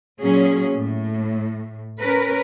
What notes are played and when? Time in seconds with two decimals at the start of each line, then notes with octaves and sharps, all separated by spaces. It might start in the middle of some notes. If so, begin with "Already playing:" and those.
0.21 A#2 F#3 C#4 G#4
0.74 A2
1.98 C#4 A#4 B4